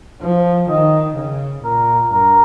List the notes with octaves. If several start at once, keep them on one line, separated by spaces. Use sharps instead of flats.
F3
D#3 D#5
C#3
A#2 A#4
G2 A#4